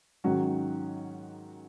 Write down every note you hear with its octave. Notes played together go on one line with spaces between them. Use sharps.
G#2 D#3 F#3 C#4 F#4